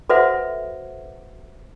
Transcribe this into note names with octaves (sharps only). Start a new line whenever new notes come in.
F#4 A4 B4 C5 E5 F#5